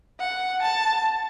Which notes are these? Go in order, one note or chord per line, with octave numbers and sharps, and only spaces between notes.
F#5
A5